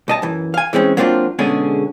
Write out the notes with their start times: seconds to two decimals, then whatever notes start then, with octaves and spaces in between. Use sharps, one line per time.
0.08 B1 D#5 A5
0.22 F#2 E3
0.54 F5 G#5
0.73 E3 G#3 C4 C#4
0.97 F#3 A#3 C4 D4 F4
1.39 B2 D3 G#3 C#4 G#4